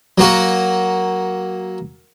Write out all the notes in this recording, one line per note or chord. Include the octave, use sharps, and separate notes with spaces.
F#3 A#3 F#4